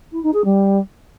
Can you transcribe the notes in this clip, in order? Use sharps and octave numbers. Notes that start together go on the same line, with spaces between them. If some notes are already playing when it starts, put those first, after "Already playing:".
E4
D#4
G#4
G3